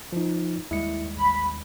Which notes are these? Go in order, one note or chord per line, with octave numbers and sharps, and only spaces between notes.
F3 D#4
D#2 G3 G#3 E4 C#7
A1 B5